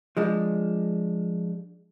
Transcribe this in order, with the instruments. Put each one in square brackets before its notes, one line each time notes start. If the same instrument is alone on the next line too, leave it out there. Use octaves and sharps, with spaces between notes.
[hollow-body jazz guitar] F3 G#3 D4